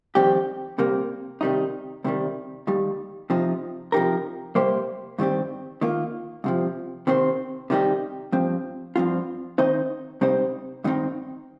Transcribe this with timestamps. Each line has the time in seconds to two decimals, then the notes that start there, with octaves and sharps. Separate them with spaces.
0.15 F2 D#3 G3 C4 G4
0.79 C3 G3 A#3
1.41 C3 D#3 G3 D#4
2.04 C2 C3 D#3 G3
2.67 D#2 D#3 G3
3.30 C3 F3 D#4
3.92 C3 F3 D#4 G4 A#4
4.55 C3 G3 A#3 G4 C5
5.18 G2 D#3 G3 C4 G4
5.81 D#3 A#3 F4
6.44 C2 C3 F3
7.07 C3 D#3 C4 F4 C5
7.70 C3 D#3 G3 D#4 G4
8.32 G2 F3 C4
8.96 G2 F3 C4 F4
9.58 D#3 C4 D#4 C5 D#5
10.21 C3 G3 C4 D#4 C5
10.84 G2 D#3 C4 D#4